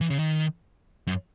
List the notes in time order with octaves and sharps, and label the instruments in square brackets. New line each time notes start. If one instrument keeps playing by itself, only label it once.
[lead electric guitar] E3
C#3
D#3
F#2